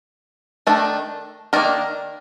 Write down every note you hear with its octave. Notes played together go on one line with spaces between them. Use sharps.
D#3 A3 D4
D#3 A#3 D4 A#4 D5